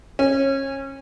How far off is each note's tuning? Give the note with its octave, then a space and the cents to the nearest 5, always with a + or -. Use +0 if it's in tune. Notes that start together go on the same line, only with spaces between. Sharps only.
C#4 -25